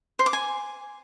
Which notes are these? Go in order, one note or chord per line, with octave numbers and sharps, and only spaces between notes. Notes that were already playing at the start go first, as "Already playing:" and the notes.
C5
D6
G#5